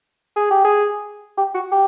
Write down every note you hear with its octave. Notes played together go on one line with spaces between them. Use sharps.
G#4
G4
G#4
G4
F#4
G4